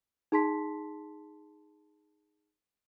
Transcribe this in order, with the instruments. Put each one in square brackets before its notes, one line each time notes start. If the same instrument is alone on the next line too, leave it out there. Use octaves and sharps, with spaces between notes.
[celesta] D#4 G#4 A5 C6 B6